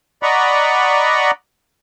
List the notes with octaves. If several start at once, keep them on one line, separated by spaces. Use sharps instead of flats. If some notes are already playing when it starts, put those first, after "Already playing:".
D5 D#5 F#5 A#5 B5 C#6